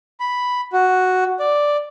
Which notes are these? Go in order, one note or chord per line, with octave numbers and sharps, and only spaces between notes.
B5
F#4
D5